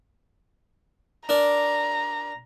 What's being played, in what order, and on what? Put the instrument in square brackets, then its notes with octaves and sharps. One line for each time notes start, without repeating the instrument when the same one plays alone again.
[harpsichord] D4 A#4 D5 [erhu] A#5